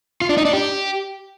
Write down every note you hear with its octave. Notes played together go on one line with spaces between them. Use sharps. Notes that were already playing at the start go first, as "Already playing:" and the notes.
F4
D4
D#4
D4
G4